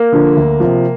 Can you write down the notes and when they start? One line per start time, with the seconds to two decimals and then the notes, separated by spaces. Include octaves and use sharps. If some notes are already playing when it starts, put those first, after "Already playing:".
Already playing: A#3
0.12 D3 F3
0.36 D2
0.60 C3 F3